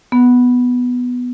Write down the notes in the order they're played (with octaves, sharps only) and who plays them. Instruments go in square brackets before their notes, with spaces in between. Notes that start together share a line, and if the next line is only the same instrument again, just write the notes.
[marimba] B3